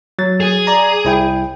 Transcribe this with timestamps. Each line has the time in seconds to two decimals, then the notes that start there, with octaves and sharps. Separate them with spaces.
0.19 F#3 A6
0.41 G#4
0.67 D5 A#5
1.05 C2 E4 G5